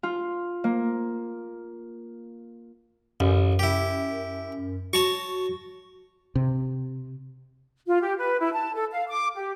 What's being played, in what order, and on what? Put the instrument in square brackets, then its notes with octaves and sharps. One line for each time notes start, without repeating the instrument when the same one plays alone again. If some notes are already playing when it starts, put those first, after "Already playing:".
[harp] F4
A#3
[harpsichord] A1 [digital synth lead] F#2
[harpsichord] E4 G4
[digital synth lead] F#4 [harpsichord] C#5 A5 C#6
[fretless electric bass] C3
[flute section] F4
G4
B4
E4
A5
A4
F5
D6
G4